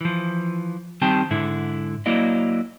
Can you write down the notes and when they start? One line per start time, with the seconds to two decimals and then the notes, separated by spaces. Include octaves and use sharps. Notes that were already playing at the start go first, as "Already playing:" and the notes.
0.01 E3 F3
1.02 D#3 G3 C4 G5 A5
1.31 G#2 D3 E4
2.06 F#3 A#3 E4 D5 D#5